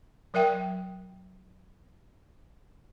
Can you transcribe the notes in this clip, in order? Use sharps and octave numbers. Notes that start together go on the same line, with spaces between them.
F#3 A#4 E5 G5